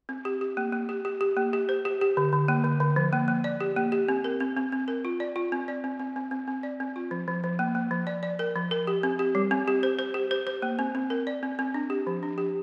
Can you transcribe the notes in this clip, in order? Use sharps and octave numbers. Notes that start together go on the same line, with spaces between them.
C4
G4
G4
A#3
A#3
G4
G4
G4
A#3
G4
C5
G4
G4
D3
D3
A#3
D3
D3
F3
A#3
A#3
D5
G4
A#3
G4
C4
A#4
C4
C4
C4
A#4
F4
D5
F4
C4
D5
C4
C4
C4
C4
C4
D5
C4
F4
F3
F3
F3
A#3
A#3
F3
D5
D5
A#4
F3
A#4
G4
C4
G4
G3
C4
G4
C5
C5
G4
C5
C5
A#3
C4
C4
A#4
D5
C4
C4
D4
G4
F3
D4
G4